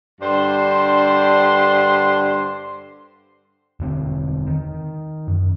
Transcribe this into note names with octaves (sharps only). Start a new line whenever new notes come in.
G2 D3 C5 D5 C6
E1 D3 C4
D#3
F#2